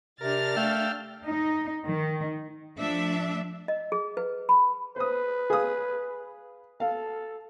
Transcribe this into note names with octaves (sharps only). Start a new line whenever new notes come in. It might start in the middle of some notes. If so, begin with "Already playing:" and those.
C3 D4 A#4 F6 A6
A3 F5 G5 E6
D#4
D#3
F3 A3 D4 E5
D#5
G#4
B4
B5
B4 C5 D#6
G#4 F5 D#6
A4 F5